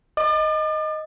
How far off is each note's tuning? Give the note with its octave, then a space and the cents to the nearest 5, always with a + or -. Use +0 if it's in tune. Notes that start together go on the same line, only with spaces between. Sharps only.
D#5 +0 D6 +45